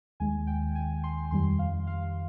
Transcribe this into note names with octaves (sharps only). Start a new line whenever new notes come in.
D#2 D#3 G#3 G#5
G5
G#5
C6
F2 D#3 G3 C6
F5
F5